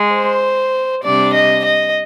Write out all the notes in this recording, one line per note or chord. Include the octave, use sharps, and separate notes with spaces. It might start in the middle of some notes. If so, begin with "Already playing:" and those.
Already playing: G#3
C5
C3 G3 D4 D5
D#5
D#5